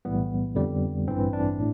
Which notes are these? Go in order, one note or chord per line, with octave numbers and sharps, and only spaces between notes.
B1 A2 E3 G3 B3
F2 D3 G3
A1 G2 E3 C4
D4
A2